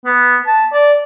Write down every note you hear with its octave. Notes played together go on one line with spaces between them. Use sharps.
B3
A5
D5